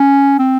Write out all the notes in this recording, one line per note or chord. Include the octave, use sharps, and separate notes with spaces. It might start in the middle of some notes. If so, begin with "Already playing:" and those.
Already playing: C#4
C4